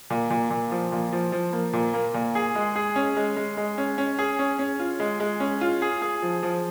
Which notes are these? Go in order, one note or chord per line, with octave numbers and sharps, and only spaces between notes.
A#2
A#2
A#2
F3
A#2
F3
F3
A#3
A#2
A#3
A#2
G#4
G#3
G#4
C#4
G#3
G#3
G#3
C#4
C#4
G#4
C#4
C#4
F4
G#3
G#3
C#4
F4
G#4
G#4
F3
F3